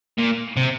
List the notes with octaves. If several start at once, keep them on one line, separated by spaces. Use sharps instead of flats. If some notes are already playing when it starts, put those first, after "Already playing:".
A#2
C3